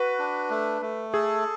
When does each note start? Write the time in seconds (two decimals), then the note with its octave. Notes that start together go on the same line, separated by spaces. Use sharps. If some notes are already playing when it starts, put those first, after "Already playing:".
Already playing: F#4 B4
0.19 D4
0.50 A3
0.82 A3
1.13 G#4 A4